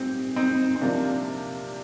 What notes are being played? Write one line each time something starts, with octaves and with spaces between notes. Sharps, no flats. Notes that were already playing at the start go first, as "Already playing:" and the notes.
Already playing: A#2 C4 D#4 G4
C4 D#4
C4
C3 F3 A#3 D4